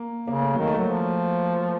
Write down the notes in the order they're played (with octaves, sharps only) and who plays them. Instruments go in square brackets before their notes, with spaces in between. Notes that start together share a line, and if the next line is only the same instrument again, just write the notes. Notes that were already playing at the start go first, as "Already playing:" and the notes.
Already playing: [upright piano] A#3
[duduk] C#3 [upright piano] A#3
[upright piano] A3
[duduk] D#3 [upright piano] F#3
[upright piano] A3
[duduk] F#3
F3